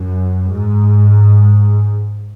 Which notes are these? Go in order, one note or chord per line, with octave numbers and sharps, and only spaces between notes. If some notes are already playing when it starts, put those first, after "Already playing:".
Already playing: F#2
G#2